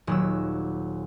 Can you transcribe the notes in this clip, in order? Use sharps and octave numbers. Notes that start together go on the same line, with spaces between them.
D#1 F#3 E6